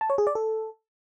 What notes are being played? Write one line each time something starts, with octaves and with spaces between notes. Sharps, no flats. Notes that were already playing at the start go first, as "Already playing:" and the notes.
A5
C#5
G#4
D5
A4